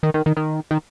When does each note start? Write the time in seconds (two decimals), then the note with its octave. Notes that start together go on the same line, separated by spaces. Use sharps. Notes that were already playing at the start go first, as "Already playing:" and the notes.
0.03 D#3
0.14 D#3
0.26 D#3
0.37 D#3
0.71 D#3